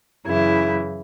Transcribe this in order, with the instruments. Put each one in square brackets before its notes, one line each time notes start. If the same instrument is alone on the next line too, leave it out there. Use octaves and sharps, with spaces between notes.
[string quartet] F#2 C#3 E3 E4